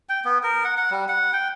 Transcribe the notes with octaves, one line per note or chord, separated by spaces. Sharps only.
G5
B3
A#4
F#5
F#5
G3
F#5
G5